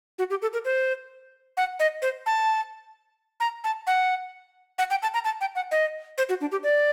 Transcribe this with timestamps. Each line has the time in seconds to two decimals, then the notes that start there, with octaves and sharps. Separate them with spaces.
0.19 F#4
0.30 G4
0.42 A4
0.53 A#4
0.65 C5
1.57 F#5
1.80 D#5
2.02 C5
2.26 A5
3.40 A#5
3.64 A5
3.87 F#5
4.78 F#5
4.90 G5
5.02 A5
5.14 A#5
5.25 A5
5.41 G5
5.55 F#5
5.71 D#5
6.18 C5
6.29 F#4
6.41 D4
6.52 G4
6.63 D5